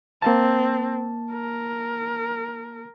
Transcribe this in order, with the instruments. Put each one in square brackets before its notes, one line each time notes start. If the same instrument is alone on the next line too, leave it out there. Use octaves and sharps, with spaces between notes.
[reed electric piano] A#3 A5 [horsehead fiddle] C4
[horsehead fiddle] A#4